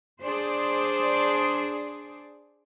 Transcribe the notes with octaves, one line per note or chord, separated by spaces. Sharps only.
D4 G#4 C5 D5